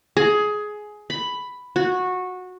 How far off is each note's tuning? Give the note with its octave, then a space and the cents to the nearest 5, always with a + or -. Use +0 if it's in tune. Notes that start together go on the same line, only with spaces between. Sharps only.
G#4 +15
B5 +5
F#4 -15